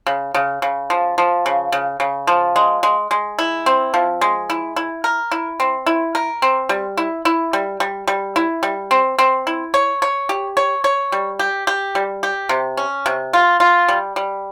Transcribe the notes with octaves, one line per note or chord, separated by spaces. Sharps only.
C#3
C#3
C#3
F3
F3
C#3
C#3
C#3
F3
G#3
G#3
G#3
E4
C4
F3
G#3
E4
E4
A#4
E4
C4
E4
A#4
C4
G3
E4
E4
G3
G3
G3
E4
G3
C4
C4
E4
C#5
C#5
G4
C#5
C#5
G3
G4
G4
G3
G4
C3
C#4
C3
F4
F4
G3
G3